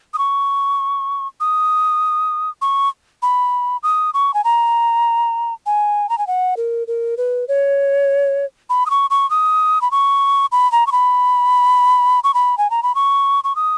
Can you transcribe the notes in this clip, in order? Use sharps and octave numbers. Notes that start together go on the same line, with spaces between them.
D#6
C#6
D#6
C#6
B5
D#6
C#6
G#5
A#5
G#5
A#5
G#5
F#5
A#4
A#4
B4
C#5
B5
D#6
C#6
C#6
D#6
B5
C#6
B5
A#5
C#6
B5
C#6
B5
G#5
A#5
B5
C#6
C#6
D#6